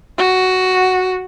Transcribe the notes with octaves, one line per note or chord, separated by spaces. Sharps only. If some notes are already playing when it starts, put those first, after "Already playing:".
F#4